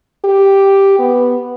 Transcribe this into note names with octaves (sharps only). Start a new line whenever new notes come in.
G4
B3